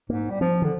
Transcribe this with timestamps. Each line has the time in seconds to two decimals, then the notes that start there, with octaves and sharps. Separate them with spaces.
0.10 G#2 A#3
0.30 G3
0.41 F3 C4
0.62 D3 D#3